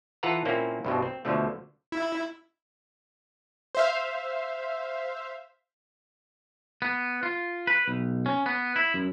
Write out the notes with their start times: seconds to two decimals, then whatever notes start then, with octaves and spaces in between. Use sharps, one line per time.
0.23 E3 F4 A4 B4 F#5 A#5
0.45 A#2 A#3 C4 C#4 E4
0.85 C2 G2 B2
1.02 C4
1.25 D2 B2 D3 F3 A3
1.92 E4
3.75 C5 E5 F5
6.82 B3
7.23 F4
7.67 B4
7.88 B1
8.26 C#4
8.46 B3
8.76 E4
8.94 F#2